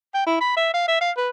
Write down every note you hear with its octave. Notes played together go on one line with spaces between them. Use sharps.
G5
E4
B5
E5
F5
E5
F5
B4